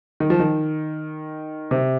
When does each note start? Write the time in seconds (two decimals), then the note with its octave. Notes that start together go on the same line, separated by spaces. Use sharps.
0.20 D#3
0.30 F3
0.40 D#3
1.71 C3